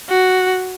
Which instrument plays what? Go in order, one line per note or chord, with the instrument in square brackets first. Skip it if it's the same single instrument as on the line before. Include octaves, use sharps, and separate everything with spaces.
[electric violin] F#4